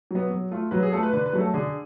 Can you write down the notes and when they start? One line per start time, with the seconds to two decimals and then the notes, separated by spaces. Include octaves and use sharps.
0.11 F#3 B3
0.31 F#3
0.51 A3 F4
0.71 F#3 B4
0.82 G#4
0.92 A3 F4 A4
1.03 B4
1.13 D3 B4
1.26 B4
1.33 F#3 A3
1.40 A4
1.54 D3 G#4